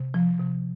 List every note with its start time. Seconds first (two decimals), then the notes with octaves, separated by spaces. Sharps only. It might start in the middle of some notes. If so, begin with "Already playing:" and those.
Already playing: C3
0.14 F3
0.40 C3